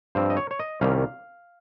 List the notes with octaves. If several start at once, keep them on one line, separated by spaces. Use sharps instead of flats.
G2 F3 C4 C5
D#5
C#5
C#5
D#5
C2 C3 D#3 G3 C#4 F5